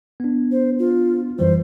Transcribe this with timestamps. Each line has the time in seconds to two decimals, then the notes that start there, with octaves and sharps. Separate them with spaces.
0.20 B3 D4
0.52 C5
0.79 F4
1.39 F#2 E3 G3 C5